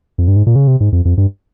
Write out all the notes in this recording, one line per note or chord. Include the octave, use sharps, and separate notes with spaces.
F2
G2
G#2
A#2
C#3
C3
G#2
F2
F2
G2